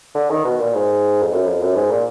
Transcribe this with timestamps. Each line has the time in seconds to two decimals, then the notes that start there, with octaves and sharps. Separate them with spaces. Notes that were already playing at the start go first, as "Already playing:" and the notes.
0.15 D3
0.30 D#3
0.45 B2
0.60 A#2
0.74 G#2
1.22 F2
1.33 F#2
1.47 F2
1.62 F#2
1.76 G#2
1.91 A#2